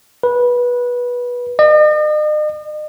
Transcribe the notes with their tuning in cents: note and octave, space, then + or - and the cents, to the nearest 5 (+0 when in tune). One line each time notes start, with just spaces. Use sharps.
B4 -15
D#5 -45